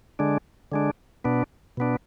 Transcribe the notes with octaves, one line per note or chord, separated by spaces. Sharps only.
D3 G#3 D4
D3 G#3 D4
B2 B3 D4
B2 B3 D4